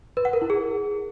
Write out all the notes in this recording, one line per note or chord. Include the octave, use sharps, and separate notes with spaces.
B4
F#5
A#4
E4
G#4